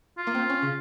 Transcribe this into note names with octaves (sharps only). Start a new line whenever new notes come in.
F4
A#3
C4
C#4
C#3